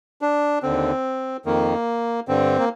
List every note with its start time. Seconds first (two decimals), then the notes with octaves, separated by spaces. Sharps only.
0.22 D4
0.63 D#2 D3 C4
1.46 F2 D#3 A#3
2.28 G2 D3 C4
2.59 A#3